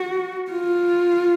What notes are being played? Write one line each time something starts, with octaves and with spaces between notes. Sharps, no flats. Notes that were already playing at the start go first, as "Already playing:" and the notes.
Already playing: F#4
F4